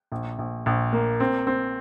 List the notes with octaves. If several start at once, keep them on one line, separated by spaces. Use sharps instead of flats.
A#1
A#1
A#1
A#3
C4
C4